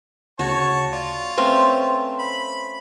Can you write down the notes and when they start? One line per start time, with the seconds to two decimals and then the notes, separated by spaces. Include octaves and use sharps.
0.39 D2 C#3 F#4 C#5 A5 C#6
0.93 F4 D5
1.38 A3 C4 C#4 B4 F5 G5 C6
2.19 B5